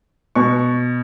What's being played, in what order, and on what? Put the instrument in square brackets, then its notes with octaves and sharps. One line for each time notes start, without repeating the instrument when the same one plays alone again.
[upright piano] B2 C#6